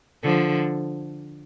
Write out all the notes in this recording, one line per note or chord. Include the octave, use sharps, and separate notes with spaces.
D3 F3